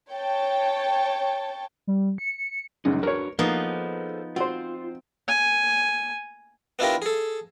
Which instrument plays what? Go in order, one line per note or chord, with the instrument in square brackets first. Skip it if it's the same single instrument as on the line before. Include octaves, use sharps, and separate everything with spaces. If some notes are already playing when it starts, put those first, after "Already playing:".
[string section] C#5 G5 A5
[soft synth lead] G3
C#7
[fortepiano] C#2 F#2 C#3 [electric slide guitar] D#4
[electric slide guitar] D4 F#4 B4 [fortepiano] A#4 C#5
[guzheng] F3 B3 D#4 [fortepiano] A#3 [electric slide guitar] G#4 A4 C5
[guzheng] C4 [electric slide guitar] F4 [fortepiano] F#4 C5
[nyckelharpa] G#5
[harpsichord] B3 D4 E4 F4 G4 A#4
G#4 A4